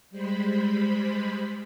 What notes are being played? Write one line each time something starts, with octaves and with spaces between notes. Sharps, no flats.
G3 G#3 C5 B5